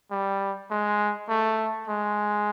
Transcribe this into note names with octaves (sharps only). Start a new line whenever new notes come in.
G3
G#3
A3
G#3